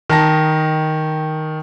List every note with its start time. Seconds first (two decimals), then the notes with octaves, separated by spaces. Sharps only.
0.10 D#3 A5 A#6